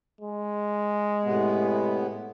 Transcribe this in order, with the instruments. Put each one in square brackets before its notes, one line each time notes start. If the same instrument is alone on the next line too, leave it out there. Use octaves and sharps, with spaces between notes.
[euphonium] G#3
[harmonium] A2 C3 B3